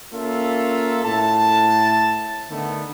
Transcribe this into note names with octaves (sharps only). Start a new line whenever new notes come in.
A#3 C#4 F4 A4 E5
A2 A4 A5
D3 D#3 A3 B3